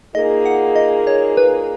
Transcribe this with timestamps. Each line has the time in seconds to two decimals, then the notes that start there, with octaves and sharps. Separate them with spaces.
0.15 A#2 A#3 D#4 G#4 D#5
0.46 F#5
0.76 D#5
1.07 C#5
1.37 B4